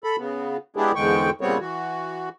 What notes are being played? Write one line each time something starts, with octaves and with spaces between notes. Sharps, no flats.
A4 B5
C#3 B3
G#3 B3 D4 E4 G4 G#4
E2 G#2 D3 G#3 G5 C#6
A#2 C#3 G3 B3 C4 C#5
E3 F#4